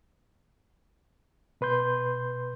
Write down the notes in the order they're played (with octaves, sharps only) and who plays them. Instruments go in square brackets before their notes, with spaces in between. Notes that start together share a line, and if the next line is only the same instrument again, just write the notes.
[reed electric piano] B2 B4 C6 G6